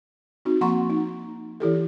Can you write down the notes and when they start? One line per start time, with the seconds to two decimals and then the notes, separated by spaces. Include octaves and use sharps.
0.45 C4 D#4 F#4
0.61 F3 A#3 F#5 A#5 C6 C#6
0.90 D#4
1.60 E3 E4 G4 A4